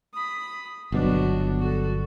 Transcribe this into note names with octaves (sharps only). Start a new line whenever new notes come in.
B5 D#6
G1 B2 F#3 D4 F#4
F#4 A4